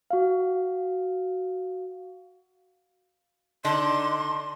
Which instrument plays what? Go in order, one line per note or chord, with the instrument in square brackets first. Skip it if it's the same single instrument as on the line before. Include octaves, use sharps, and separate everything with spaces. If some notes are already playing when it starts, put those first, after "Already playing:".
[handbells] F#4 F5
[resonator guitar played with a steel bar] D3 D4 D#4 [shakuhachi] C6